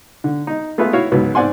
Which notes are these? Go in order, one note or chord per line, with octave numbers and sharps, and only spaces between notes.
D3
D#4
G#3 A3 B3 F4 B4 E5
E4 F#4 C#5 F5
C#2 G#2 F#3 B3
G#2 C4 D5 F#5 G#5 C6